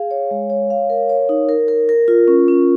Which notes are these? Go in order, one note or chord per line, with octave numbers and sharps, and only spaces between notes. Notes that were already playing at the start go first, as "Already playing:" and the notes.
Already playing: G#4 F5
C#5
G#3
C#5
F5
A#4
C#5
D#4
A#4
A#4
A#4
F4
C#4
C#4